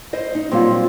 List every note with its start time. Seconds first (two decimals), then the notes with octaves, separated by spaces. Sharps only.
0.13 E4 C5 D#5
0.35 D#4
0.51 A#2 F#3 G3 C4 F4